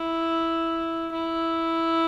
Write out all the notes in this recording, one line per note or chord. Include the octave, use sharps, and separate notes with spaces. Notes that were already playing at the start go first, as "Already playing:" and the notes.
Already playing: E4
E4